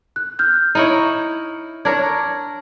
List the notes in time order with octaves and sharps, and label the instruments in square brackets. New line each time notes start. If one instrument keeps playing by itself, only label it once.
[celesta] F#6
F6 G6
[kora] D#4 E4 C#5
[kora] D4 A#4 C#5 [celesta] G#6